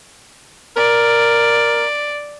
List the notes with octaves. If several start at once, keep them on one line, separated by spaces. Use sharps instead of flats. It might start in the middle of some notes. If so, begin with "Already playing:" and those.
A#4 D5